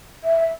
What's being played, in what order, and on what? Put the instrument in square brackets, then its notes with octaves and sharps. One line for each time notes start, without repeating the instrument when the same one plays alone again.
[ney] E5